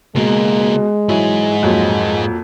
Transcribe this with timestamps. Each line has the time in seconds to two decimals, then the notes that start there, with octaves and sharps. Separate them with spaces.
0.15 C#2 B2 G#3 A#3
1.09 G#2 E3 F#3 E4 G#4
1.63 F2 A#2 F#3